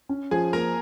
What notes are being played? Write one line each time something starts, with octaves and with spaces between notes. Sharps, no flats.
C#4
F3 G#4 G#5
A#3 A#4 A#5